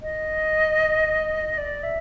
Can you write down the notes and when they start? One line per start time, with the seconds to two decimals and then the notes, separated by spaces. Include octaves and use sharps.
0.02 D#5
1.58 D5
1.83 E5